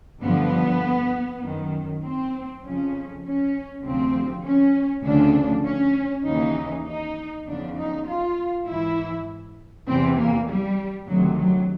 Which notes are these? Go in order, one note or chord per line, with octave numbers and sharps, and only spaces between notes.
G2 D3 F3 B3
F#2 D#3
C4
F2 C#3 F3 C#4
C#4
D2 C3 F3 C4
C#4
D2 C#3 F3 D4
C#4
D#2 C#3 E3 D#4
D#4
E2 C#3 F3 D4
D#4
F4
G#2 E3 E4
E2 C3 E3 C4
A#3
G3
D2 C3 D#3 F#3
F#3